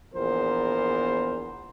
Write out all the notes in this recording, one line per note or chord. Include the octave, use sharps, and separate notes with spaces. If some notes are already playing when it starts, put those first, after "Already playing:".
A#1 E2 B3 A#4 C5